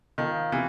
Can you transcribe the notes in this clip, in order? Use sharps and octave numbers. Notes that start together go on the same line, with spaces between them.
D#3 F3
C3 E3